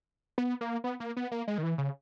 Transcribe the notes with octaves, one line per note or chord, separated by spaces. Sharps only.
B3
A#3
B3
A#3
B3
A#3
G#3
D#3
E3
C#3